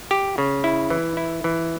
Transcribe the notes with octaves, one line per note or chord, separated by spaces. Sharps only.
G4
C#3
E4
E3
E4
E3